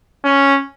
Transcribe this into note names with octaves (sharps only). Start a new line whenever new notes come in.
C#4